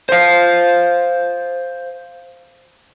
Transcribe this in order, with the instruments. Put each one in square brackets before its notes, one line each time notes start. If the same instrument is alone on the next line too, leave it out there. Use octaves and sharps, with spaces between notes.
[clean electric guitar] C5 F5